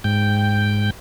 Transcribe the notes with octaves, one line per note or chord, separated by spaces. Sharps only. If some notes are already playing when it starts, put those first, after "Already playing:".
G#2 G5